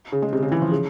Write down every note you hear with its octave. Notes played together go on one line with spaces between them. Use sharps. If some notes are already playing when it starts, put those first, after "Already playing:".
C#3
G#3
C3
C#3
E3
F3
C#3